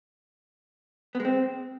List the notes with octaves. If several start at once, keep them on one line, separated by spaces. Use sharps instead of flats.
B3
G#3
C4